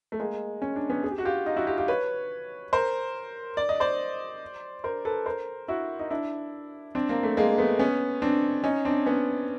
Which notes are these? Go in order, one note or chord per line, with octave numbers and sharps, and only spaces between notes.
A3
G#3 A#3
C#4
D4
B3 C#4
G#4
G4
F#4
F4 G4
D#4 F4
E4 F#4
F4 G4
F4 G4
B4 C#5
A#4 C5
D5
D#5
C5 D5
A#4 C5
A4 B4
A#4 C5
E4 F#4
D#4
D4 E4
C4 D4
A#3 C4
A3
G#3 A#3
A3 B3
B3 C#4
C4 D4
C#4 D#4
C4 D4
B3 C#4